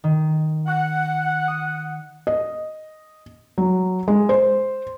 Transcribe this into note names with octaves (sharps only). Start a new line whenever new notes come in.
D#3
F#5
D#6
D#5
F#3
G#3
C5